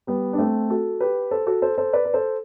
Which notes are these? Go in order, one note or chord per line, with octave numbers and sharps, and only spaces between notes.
G3 B3
D4
A3 C4
F#4 A4
G4 B4
A4 C5
F#4 A4
A4 C5
A4 C5
B4 D5
B4
A4 C5